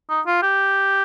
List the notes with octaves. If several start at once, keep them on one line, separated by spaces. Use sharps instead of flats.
D#4
F4
G4